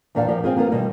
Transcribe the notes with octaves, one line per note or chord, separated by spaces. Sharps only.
E2 A#2 D#3 D4 D5 F5
F3 G4 A#4
C4 F4 G#4
A#3 B3 F4 A#4
B2 D#3 G3